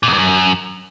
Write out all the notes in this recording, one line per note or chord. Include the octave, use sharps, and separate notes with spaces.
A#2
E2
G2
F#2